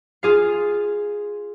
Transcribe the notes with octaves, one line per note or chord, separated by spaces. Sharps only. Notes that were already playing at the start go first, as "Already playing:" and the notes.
F4 G#4 F5